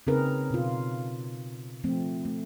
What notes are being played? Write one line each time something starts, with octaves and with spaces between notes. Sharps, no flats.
C#3 C4 D#4 G#4 A#4 B4
B2 F4
F3 A3 C4
A3